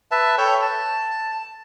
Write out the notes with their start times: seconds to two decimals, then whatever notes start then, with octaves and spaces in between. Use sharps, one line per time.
0.11 B4 E5 A5
0.38 A4 C#5 G5
0.62 A5